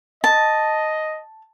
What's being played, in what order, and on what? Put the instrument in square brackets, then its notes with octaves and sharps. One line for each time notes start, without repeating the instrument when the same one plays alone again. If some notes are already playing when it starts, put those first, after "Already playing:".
[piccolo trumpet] D#5 [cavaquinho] A5